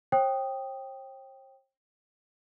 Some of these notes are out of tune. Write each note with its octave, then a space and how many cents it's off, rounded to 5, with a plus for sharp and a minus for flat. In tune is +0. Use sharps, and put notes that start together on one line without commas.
C5 +45 G5 +0 D#6 +0